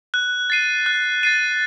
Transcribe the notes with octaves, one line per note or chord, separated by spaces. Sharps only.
F#6
A6 C7 D#7
F#6
A6 C7 D#7